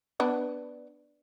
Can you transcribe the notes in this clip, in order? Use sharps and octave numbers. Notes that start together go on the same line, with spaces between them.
B3 D4 B4